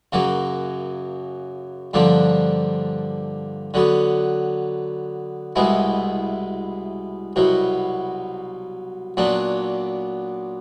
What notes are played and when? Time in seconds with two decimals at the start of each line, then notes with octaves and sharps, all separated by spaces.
0.12 F#2 C#3 F#3 A#3
1.94 G2 D3 F3 A#3 D4
3.74 D3 F#3 B3
5.56 C2 B2 G#3 B3 E4
7.36 C2 B2 F#3
9.17 A#2 F#3 B3 D4